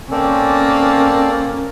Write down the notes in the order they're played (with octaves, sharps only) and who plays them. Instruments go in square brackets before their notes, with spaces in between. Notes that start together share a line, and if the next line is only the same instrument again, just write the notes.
[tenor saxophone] A#3 [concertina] C4 A4 D5 [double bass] C#4